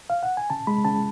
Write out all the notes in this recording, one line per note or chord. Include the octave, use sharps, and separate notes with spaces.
F5
F#5
G#5
C#3 A5
G#3 B5
C#3 A5